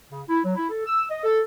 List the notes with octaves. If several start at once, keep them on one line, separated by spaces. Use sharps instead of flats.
C#3
E4
F#3
E4
A4
E6
D#5
A4